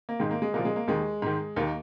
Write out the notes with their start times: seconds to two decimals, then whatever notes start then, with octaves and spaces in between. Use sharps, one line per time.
0.09 A#3
0.19 G#2 D#3 G#3
0.31 A#3
0.42 G#3
0.53 C2 A#2 F3 A#3
0.65 G#3
0.76 A#3
0.88 D#2 D#3 G#3
1.22 G#2 D#3
1.56 D#2 D#3 A#3